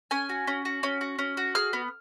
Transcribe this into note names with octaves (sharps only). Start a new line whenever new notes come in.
C#4 G#5
F#4
C#4
F#4
C#4
F#4
C#4
F#4
G#4 F6
B3